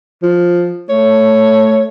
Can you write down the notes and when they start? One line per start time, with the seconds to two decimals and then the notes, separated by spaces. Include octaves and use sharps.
0.23 F3
0.89 A3 C#5